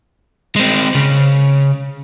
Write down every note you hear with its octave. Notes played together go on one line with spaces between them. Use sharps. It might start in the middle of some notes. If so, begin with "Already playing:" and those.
G#3 C4
C#3